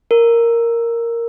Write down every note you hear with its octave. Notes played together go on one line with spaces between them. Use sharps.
A#4